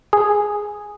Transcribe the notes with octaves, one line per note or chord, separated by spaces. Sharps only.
G#4